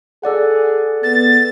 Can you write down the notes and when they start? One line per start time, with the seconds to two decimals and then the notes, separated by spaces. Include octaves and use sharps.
0.23 G#4 A4 D5 F#5
1.03 B3 A6